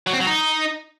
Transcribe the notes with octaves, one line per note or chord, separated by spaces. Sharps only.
F#3
C4
F#3
D#4